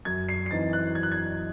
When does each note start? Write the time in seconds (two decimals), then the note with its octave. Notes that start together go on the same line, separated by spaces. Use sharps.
0.05 F#2 G#6
0.29 C7
0.46 C7
0.51 E3 C4 D#4 A6
0.73 F#6
0.95 F#2 G#6
1.03 F#6
1.12 G#6